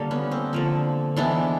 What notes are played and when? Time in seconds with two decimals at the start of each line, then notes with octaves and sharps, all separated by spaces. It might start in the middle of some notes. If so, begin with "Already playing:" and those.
Already playing: D3 G3 A#3
0.11 B3 C#4
0.31 C4
0.53 D3 F3 A#3
1.16 E3 G#3 B3 D4 E4